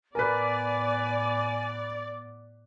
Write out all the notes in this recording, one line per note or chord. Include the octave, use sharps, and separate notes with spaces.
A2 B3 A#4 B4 D5 G#5